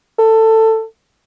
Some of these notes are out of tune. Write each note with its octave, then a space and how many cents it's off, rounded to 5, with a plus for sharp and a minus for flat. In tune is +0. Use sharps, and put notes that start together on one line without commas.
A4 +15